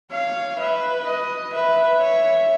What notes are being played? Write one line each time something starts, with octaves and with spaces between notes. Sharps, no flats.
C#5 F5
B4 E5
D#5
B4 E5
C#5